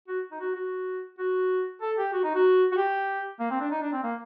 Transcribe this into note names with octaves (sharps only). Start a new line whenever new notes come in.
F#4
D#4
F#4
F#4
F#4
A4
G4
F#4
D#4
F#4
F#4
G4
A#3
C4
D4
D#4
D4
C4
A#3